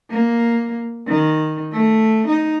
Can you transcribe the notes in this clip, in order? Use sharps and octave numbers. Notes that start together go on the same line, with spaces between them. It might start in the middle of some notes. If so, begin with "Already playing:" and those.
A#3
D#3
A3
D#4